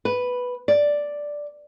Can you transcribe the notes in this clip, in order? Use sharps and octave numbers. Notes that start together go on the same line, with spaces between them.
B4
D5